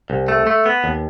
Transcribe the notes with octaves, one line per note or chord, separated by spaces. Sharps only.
C2
A3
A3
B3
D#2